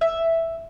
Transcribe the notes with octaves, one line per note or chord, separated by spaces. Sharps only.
E5